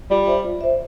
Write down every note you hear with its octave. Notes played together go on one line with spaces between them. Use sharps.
G3 F4
C5 E5
F4
C5 E5